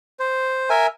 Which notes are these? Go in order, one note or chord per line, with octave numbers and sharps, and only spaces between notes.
C5
A#4 E5 G#5